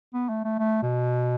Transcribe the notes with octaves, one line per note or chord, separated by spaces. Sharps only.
B3
A3
A3
A3
B2